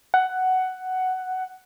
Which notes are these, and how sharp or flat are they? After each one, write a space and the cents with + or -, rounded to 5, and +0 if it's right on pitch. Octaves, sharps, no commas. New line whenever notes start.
F#5 +10